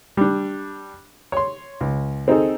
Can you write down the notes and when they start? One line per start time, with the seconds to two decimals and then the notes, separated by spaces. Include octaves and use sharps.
0.17 G3 D4
1.32 C#5 C6
1.81 C#2
2.28 C4 D#4 G#4 A4